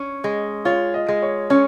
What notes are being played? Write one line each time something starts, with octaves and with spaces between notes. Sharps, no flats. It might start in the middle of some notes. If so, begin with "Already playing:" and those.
Already playing: C#4
G#3
F4 C#5
D#5
G#3
C#5
C#4 C#5